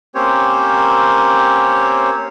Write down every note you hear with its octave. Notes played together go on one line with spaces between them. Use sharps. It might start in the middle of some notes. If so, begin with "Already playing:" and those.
A#3 C4 C#4 G4 C5 C#5